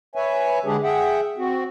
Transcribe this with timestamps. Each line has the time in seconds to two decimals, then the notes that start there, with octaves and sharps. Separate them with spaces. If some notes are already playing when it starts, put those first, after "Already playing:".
0.15 B4 C#5 E5 G#5
0.65 D3 G#3 D4 G4 G#4
0.83 G#4 E5 F#5 G5
1.38 C4 F#4